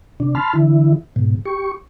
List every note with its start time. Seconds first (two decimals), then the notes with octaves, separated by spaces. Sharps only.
0.20 C3 D4
0.35 A5 B5 C6 F6
0.53 D3 E3 E4
1.16 G#2 B2
1.45 G4 C#6